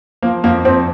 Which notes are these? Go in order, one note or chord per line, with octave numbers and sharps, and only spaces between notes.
F3 A#3
F2 A#3
F2 C4